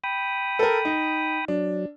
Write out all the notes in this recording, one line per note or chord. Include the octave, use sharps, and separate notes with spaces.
G5 B5 D#6
A4 A#4
D#4
F#3 D4